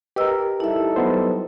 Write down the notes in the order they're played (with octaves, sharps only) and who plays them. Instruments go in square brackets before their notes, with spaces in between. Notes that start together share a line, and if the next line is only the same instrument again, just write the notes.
[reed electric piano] G4 A#4 [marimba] B4 D#5 E6
[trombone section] G3 D#4 A4 [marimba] E4 E5
[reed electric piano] F#3 B3 C5